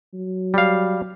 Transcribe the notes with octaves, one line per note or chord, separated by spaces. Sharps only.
F#3
G3 F5